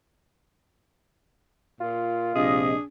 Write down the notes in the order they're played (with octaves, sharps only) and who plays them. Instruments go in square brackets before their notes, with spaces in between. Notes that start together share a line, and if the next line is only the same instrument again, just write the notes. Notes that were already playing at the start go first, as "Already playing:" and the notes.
[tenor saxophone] A#2 [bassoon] F4
[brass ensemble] A#1 C3 D#5 [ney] D4 [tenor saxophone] G#4